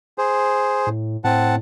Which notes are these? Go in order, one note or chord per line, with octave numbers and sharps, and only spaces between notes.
G#4 C5
A2
A2 C4 F#5 A5